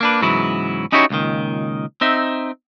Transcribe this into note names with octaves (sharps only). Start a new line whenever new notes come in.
A#3 D4 B4
G#2 C#3 E3 F#3 B3 E4
C#4 D#4 E4 F#4 G4 C#5
C#2 A#2 D#3
C4 D#4 E5